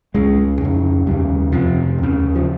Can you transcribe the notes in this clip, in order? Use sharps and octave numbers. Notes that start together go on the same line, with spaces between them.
C#2 C#3 G#3
F2 C#3
D#2 C#3 G3
F2 C3 F3
D#2 C#3
F3